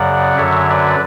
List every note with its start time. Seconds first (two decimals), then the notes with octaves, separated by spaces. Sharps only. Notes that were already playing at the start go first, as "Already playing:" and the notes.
Already playing: F#2 C#3 F#3 D5 F#5
0.38 F#2 D3 F#3 C#5 E5
0.69 B4 D5